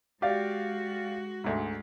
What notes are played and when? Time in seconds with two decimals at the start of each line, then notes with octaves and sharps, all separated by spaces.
0.22 G#3 F#4 G4 D5 F5
1.44 D2 G#2